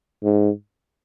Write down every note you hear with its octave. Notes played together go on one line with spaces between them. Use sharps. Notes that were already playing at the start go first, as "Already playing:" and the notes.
G#2